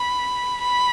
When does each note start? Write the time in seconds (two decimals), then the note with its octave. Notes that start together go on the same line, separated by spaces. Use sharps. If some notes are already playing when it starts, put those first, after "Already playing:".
Already playing: B5
0.61 B5